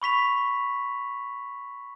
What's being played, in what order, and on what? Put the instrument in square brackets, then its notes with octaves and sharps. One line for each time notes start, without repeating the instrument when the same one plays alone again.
[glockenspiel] B5 C#6 B6 F7